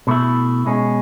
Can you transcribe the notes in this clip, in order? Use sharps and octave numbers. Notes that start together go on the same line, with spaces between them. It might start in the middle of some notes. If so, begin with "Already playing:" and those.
B2 A3 E4
B2 G#3 C#4